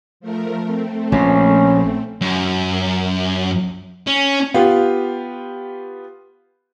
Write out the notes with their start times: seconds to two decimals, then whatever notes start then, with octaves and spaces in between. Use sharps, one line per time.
0.20 F3 A3 A#4
0.62 A3 C4
1.12 A#1 A#2 C#4
2.21 F#2
4.07 C#4
4.54 B3 F4 G4 F5